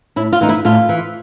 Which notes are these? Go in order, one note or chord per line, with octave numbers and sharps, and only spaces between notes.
A2 E4
F4
E3 D#4
E4
A2 F4
E3